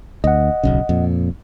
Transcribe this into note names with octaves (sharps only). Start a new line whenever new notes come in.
D2 D#5 F#5
D1 B1 C#3
F2 A#2